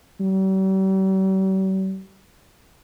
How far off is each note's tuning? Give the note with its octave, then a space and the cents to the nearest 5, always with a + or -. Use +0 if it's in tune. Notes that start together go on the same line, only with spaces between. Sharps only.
G3 -45